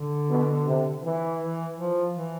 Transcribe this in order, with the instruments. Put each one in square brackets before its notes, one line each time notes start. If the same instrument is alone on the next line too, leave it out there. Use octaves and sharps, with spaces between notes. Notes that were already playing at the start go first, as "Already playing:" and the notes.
Already playing: [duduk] D3
[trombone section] B2
C3
E3
[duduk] E3
F3
E3